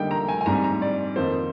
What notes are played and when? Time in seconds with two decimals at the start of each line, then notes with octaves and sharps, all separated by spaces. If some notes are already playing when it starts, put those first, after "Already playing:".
Already playing: D3 G3 A#3 D#4 G5
0.11 A#5
0.28 G#5
0.41 G#5
0.46 G#2 G3 C4 A#5
0.64 A#5
0.82 D5
1.16 F2 D#3 A#3 D#4 C5